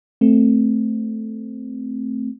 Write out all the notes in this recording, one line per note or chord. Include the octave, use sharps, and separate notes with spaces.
A3 C4